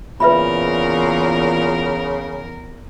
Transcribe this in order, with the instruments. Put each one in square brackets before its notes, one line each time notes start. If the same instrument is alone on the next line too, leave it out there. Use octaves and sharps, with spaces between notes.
[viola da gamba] E2 A#4 [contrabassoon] A#2 [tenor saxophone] C#3 [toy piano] B4 E5 B5